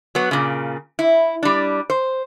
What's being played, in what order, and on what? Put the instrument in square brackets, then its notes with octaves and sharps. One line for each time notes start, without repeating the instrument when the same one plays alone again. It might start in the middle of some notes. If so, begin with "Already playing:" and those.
[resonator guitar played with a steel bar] F#3 B3
A#2 C#3
E4
G3 D4
C5